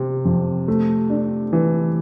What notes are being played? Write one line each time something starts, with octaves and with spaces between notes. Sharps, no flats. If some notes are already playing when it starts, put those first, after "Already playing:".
Already playing: C3
F2
A3
D4
E3